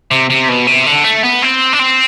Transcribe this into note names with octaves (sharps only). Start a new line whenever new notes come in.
C3
C3
B2
C3
D3
A3
B3
C4
D4
C4